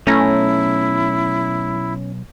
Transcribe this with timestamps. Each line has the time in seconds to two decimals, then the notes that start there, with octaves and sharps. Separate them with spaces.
0.07 B1 A3 C#4 E4 A#5